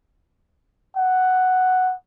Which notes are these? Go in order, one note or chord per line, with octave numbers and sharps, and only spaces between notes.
F#5